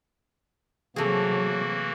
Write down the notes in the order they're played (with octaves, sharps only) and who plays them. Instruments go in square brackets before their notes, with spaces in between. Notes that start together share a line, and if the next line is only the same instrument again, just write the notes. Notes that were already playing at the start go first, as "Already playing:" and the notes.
[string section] C3 F#3 [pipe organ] E3 A#3 F#4 [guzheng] A3 G#4